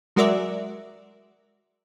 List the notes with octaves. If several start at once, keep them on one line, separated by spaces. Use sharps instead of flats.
F#3 G#3 F#4 A#4 D5 E5